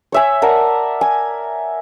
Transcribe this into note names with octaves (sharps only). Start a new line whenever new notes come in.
C#5 E5 G#5
A#4 D5 F#5 A5
G#5